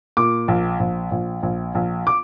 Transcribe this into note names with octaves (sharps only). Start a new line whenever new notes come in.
A#2 D6
A#1
A#1
A#1
A#1
A#1
D6